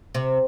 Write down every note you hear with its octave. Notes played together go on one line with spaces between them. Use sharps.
C3